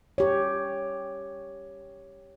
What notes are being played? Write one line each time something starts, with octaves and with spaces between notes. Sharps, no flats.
G4 C#5